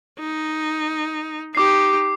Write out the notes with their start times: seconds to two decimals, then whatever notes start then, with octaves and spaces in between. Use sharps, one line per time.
0.20 D#4
1.55 D#4 G4 D6 C7